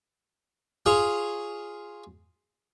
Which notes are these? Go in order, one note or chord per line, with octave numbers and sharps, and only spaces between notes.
F4 G#4 C#5